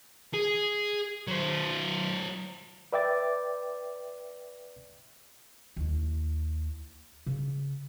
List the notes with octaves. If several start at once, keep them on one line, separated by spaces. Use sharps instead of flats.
G#4
F#3 C5
B4 D5 E5 G5 D6 A6
D#2 E4
C#3